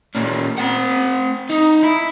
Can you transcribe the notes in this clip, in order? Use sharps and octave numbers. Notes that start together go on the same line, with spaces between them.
A#2 C#4
C4 F#5
D#4
E4